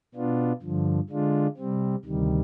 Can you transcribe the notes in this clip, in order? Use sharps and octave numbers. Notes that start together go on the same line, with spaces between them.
B2 B3 D4 F4
G2 D3 F3
D3 G#3 D4 F4
C3 G3 C4
D2 C3 D#3 G3